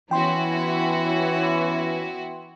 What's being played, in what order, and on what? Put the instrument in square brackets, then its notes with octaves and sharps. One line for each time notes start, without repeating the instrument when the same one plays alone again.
[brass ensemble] E3 C#4 [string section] B3 E4 F#4 [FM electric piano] G5 C6